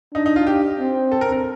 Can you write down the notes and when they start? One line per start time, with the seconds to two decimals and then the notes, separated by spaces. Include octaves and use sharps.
0.14 D4 D#4
0.26 D#4
0.36 F4
0.47 G4
0.79 C4
1.12 A4
1.21 A#4
1.32 A#4